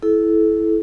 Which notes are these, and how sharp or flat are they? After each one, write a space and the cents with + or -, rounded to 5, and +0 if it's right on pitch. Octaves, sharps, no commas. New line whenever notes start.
E4 +0 A4 -30